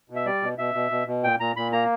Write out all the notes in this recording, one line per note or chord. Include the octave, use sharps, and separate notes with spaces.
B2
E5
G3 D5
B2
B2 E5
B2
B2
B2
A#2 G5
A#2 A#5
A#2 B5
A#3 A#5